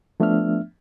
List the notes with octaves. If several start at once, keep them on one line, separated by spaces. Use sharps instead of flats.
F3 A3 B3 D4 E5 F6